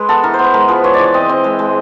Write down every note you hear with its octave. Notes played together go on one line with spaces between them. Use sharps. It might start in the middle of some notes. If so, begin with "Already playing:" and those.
Already playing: G#3 B4
B3 A4
E3 A#4
C5
B3 B4
G#3 A#4
F3 B4
E3 C#5
D5
E3
D5
C4 D#5
C4 D#5
G#3
G#3